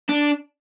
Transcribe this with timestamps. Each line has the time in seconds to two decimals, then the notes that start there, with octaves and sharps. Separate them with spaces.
0.09 D4